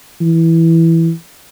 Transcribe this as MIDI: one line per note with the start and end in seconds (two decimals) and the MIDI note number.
0.21 1.12 52